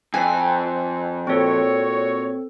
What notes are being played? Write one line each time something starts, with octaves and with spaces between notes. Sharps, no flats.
F2 G#5
A#2 C4 F#4 A4 C#5